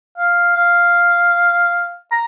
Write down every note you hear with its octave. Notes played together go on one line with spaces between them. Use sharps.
F5
F5
A#5